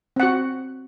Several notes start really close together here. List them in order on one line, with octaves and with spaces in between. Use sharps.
C4 F#5 F#4